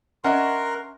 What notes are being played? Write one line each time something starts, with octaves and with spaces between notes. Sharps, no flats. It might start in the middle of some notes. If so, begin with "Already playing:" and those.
C#4 A#4 D#5 E5 F#5 C6